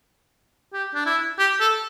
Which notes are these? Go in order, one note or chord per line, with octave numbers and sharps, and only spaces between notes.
G4
D4
E4
G4
A4